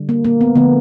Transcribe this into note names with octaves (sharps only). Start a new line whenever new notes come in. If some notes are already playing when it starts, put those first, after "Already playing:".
Already playing: D3 G3
A#3
A#3
B3
D3 F3 A3 B3